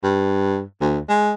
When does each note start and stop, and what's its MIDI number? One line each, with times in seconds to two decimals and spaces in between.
0.04 0.62 43
0.81 0.99 38
1.09 1.33 56